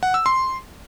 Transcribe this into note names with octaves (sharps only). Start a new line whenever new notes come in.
F#5
E6
C6